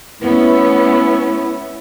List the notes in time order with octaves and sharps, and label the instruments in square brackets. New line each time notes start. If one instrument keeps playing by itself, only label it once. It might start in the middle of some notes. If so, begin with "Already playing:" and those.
[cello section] A3 B3 C#4 [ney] E4